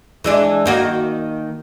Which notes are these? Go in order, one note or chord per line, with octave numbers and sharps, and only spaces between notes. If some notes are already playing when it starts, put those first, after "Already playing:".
E3 G#3 D4
D#3 A#3 F#4